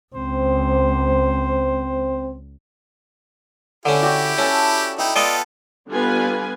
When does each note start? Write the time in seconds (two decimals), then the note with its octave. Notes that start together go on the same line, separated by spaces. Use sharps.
0.15 C#2 C4 C5
3.85 D3 C#4 E4 G4
4.02 F#4 D5 G5
4.38 C#4 A4 A5
4.99 D#4 E4 G5
5.16 B3 F4 A4 D5 D#5
5.89 D3 G3 B3 F4 B4 G#5